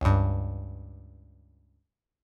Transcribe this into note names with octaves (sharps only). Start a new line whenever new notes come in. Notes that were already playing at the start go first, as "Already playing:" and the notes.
C#2 G2